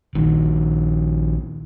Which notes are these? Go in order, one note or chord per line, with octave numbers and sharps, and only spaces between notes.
A#1 D#3